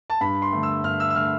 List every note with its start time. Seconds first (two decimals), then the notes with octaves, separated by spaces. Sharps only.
0.10 A5
0.21 G2 B5
0.42 C6
0.53 D3 A3
0.63 E6
0.84 G2 F6
1.00 E6
1.10 E6
1.16 D3 A3 F6